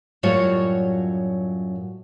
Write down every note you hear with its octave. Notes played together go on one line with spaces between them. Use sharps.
F#2 A2 F#3 G3 F4 C#5